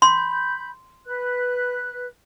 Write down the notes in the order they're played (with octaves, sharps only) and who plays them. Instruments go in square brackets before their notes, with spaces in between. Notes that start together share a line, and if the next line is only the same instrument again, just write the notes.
[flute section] B5 G6 [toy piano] C6
[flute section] B4 F#6